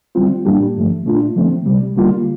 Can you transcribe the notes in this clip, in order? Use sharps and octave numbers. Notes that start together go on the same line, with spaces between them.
D3 G3 C4 F4
A2 G3 A#3 D4 G4
G2 D3 F3 A3
A#2 A3 D4 F4
D3 F3 A3 C4
C2 C3 G3
D3 G3 A#3 F4